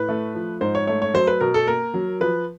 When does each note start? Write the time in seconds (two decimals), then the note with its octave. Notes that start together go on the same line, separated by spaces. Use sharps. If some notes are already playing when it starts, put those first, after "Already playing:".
Already playing: A2 B4
0.09 A3
0.35 F3
0.61 G#2 C5
0.75 C#5
0.87 A3 C#5
1.02 C#5
1.14 F#3 C5
1.27 B4
1.41 B2 A#4
1.54 A4
1.67 A#3 A#4
1.94 F#3
2.20 F3 B4